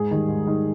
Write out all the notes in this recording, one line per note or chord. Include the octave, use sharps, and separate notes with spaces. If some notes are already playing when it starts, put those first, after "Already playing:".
Already playing: G#2 G#4
D#3 G3
G#2
D#3 G3